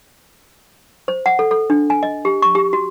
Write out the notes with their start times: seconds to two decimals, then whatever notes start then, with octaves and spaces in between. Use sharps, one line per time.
1.08 C5
1.26 F#5
1.39 A4
1.51 A4
1.70 D4
1.90 G#5
2.03 D#5
2.25 G4
2.42 C#6
2.55 G4
2.73 F#4